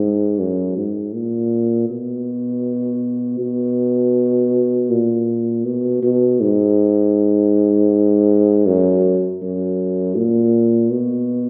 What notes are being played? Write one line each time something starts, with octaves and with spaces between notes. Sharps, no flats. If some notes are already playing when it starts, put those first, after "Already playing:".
Already playing: G#2
F#2
G#2
A#2
B2
B2
A#2
B2
B2
G#2
F#2
F#2
A#2
B2